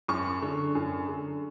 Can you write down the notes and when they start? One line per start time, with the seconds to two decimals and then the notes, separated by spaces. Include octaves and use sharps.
0.08 F#2 C#6
0.42 D3
0.75 F#2
1.08 D3